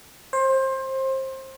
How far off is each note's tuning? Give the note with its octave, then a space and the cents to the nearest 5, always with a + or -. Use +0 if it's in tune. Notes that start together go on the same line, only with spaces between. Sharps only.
C5 +25